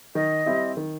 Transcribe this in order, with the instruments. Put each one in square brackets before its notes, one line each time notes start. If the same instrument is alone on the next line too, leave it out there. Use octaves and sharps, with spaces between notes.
[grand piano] D#3 [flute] D#5
[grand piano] G3 C4 E4
D#3